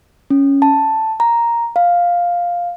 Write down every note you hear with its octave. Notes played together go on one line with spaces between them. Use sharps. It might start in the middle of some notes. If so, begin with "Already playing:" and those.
C#4
A5
A#5
F5